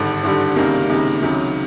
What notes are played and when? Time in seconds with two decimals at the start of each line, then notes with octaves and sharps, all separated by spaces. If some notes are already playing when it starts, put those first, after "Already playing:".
Already playing: G#1 G2 D3 G3
0.23 G#1 G2 D3 G3
0.56 C#2 C3 D#3 G3 A#3
0.89 C#2 C3 D#3 G3 A#3
1.21 C#2 C3 D#3 F#3